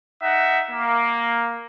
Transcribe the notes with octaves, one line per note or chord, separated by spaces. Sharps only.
D#4 E5 F#5
A#3